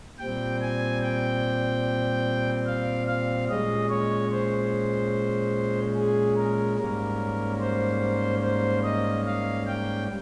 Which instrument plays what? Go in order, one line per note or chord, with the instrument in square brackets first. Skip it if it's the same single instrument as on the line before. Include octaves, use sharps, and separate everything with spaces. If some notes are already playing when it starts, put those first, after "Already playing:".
[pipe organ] A#2 G3 C4 G5
G#5
G5
F5
F5
A#2 G#3 C#4 D#5
C#5
C5
G#4
A#4
G#2 G3 A#3 C#4 A#4
C5
C5
D#5
F5
G5